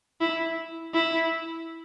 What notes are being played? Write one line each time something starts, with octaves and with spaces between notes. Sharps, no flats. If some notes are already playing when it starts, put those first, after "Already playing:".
E4
E4